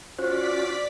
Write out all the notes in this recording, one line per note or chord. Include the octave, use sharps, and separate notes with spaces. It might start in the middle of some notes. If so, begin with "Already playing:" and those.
C#4 F4 F#4 C5 D5 B6